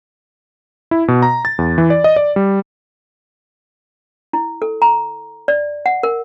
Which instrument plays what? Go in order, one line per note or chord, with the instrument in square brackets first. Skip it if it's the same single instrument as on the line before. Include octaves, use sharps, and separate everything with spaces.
[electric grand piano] E4
B2
A#5
A6
E2
E3
D5
D#5
D5
G3
[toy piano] E4
A4
A#5
D5
F#5
A#4